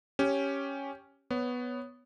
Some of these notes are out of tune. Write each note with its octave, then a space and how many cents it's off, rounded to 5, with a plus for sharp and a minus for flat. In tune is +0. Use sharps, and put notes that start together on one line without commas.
C#4 +0 G4 +0
B3 +0 C#5 +0